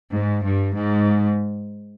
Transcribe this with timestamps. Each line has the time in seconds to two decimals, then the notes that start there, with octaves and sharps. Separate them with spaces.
0.13 G#2
0.43 G2
0.72 G#2